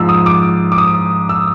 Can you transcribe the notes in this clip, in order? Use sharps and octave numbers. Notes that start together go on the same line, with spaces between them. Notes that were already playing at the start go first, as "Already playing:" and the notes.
Already playing: G#2 F3 E6
D#6
D6
D6
D#6
E6